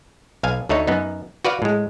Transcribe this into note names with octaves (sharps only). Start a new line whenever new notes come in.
B1 F5 G#5
D2 A3 D#4 C#5
F#2 B3 D#4
F#4 B4 D5 F5
A2 G#3